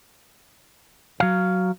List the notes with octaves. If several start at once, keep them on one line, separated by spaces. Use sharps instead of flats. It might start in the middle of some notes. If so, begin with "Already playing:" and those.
F#3 F5